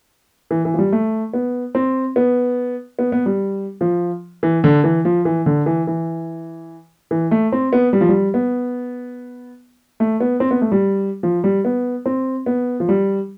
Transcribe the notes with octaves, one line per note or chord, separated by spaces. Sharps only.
E3
E3
F3
G3
A3
B3
C4
B3
B3
B3
G3
F3
E3
D3
E3
F3
E3
D3
E3
E3
E3
A3
C4
B3
G3
F3
G3
B3
A3
B3
C4
B3
A3
G3
F3
G3
B3
C4
B3
F3
G3